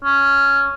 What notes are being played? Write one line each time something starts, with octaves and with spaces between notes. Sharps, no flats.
C#4